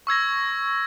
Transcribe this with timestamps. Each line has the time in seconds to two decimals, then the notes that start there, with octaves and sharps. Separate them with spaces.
0.07 C#6 E6 G#6 A#6